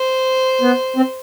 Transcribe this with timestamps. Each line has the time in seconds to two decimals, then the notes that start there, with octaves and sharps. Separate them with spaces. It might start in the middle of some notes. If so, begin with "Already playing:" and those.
Already playing: C5
0.61 B3
0.96 C4